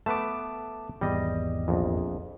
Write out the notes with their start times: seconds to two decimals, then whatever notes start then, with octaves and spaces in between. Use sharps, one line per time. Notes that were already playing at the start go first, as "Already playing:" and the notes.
0.06 A3 B3 B4 A5 D6
1.01 G#1 E2 G3 D#5
1.68 A#1 F2